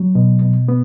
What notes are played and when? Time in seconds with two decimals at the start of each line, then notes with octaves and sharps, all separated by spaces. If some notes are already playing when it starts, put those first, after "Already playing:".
Already playing: F#3
0.15 B2
0.42 B2
0.68 B3